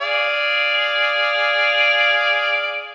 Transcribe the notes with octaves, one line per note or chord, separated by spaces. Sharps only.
G#4 D5 F5